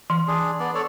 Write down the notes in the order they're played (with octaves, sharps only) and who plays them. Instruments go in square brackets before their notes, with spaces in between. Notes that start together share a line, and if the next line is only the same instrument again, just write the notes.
[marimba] E3 [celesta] C6
[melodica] D4 G#4
B3 D5
A4 C#5 D5